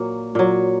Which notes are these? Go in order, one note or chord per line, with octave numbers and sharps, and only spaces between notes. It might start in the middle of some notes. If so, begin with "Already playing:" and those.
Already playing: A#2 F#3 A#3
A#2 F#3